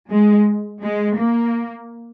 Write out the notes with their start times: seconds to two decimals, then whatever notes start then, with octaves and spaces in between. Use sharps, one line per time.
0.11 G#3
0.82 G#3
1.17 A#3